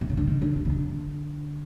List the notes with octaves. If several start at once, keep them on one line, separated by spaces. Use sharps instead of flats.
C3
C#3
D3
D#3
D3
D3
C#3
D3